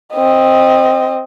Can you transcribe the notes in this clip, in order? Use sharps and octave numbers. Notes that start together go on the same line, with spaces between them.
C4 D#5